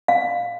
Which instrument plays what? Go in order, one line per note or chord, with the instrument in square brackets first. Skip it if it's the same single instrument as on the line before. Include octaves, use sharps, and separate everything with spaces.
[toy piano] F5